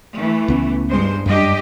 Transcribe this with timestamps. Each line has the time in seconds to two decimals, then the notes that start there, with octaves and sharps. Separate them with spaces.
0.14 E3 A3
0.48 C#2 B3 C#4
0.89 G2 G#3 C5
1.26 F#2 G3 D4 G4 D#5